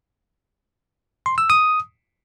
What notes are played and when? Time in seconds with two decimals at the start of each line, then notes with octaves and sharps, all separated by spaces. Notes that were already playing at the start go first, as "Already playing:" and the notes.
1.26 C6
1.38 E6
1.50 D#6